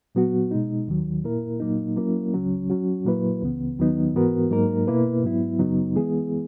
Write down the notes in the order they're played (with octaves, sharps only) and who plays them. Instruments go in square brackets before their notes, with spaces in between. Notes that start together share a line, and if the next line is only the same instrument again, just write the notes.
[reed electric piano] A#2 F#3 B3 F#4
B2 G#3 D#4
D#2 D#3 F#3
A#2 A#3 E4 A#4
A#2 F#3 A#3 D#4
F#3 A#3 C#4 E4 A#4
C#2 C#3 F#3 C#4
F#3 C#4 F#4
A#2 F#3 A#3 E4 B4
C#2 C#3 E3 B3
D#2 D#3 F#3 B3 D#4
G#2 E3 B3 F#4 A#4
G#2 F#3 A#3 D#4 A#4
B2 A#3 E4 B4
G#2 F#3 B3 E4
F#2 C#3 F#3 B3 D#4
E3 G#3 B3 E4 G#4